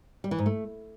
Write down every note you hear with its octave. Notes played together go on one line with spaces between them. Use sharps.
G3
E3
G#2
A3